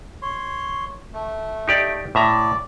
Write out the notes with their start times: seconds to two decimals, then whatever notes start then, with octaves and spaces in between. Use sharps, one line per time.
0.22 C#5 C6
1.13 A3
1.68 D#4 G4 D5
2.15 A2 D5 E5 A#5